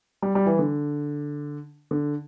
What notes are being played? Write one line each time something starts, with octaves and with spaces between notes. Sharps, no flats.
G3
G3
E3
D3
D3